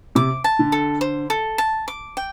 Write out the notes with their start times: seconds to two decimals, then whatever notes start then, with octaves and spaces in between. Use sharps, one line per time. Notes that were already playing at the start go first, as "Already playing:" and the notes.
0.15 C3 D6
0.44 A5
0.59 D3
0.72 A4
1.01 C5
1.30 A4
1.58 A5
1.88 D6
2.17 G5